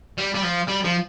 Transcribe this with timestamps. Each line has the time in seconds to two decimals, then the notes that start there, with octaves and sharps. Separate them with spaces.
0.18 G3
0.35 G3
0.43 F3
0.67 G3
0.84 F3